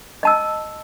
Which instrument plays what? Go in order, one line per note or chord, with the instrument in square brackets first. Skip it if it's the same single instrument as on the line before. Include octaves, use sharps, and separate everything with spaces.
[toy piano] D#5 A5 E6